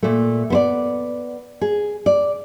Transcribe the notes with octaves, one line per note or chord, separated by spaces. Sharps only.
A#2 A3
B3 C5 D5
G#4
D5